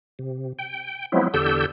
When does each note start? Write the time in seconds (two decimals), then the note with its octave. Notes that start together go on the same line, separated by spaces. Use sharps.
0.19 C3
0.59 G5
1.12 F3 F#3 G#3 B3 C4 E4
1.34 E2 D3 G4 A4 E6 G6